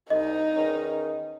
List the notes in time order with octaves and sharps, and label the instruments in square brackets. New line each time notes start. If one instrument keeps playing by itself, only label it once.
[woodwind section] C2 [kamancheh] D#4 [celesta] D#5
[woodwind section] E2 D#3 C#4